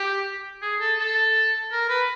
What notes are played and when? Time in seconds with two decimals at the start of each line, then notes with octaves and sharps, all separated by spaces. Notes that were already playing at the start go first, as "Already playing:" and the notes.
Already playing: G4
0.62 G#4
0.80 A4
0.99 A4
1.72 A#4
1.89 B4